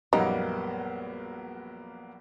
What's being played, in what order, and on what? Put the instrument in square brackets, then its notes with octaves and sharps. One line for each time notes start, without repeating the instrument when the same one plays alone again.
[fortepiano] A#1 F#2 [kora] G3 [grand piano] A#3 B3 [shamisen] D#4